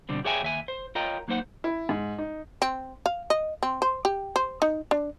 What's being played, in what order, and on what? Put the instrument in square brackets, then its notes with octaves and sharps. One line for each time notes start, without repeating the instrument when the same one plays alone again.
[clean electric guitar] B2 D3 G3 C4
G4 G#4 C#5 E5 G5 G#5
D#2 E5 G#5
C5
F4 A#4 C#5 D#5 G5 A#5
F#3 A#3 D#4 C5 F#5
[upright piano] E4
G#2
D#4
[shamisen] C4
F5
D#5
C4
C5
G4
C5
D#4
D4